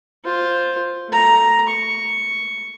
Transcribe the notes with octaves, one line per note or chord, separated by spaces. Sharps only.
F4 C5
A3 A#5
C#6